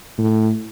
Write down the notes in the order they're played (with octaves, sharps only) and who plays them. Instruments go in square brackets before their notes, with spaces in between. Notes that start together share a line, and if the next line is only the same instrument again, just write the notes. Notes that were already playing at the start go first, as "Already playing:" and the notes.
[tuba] A2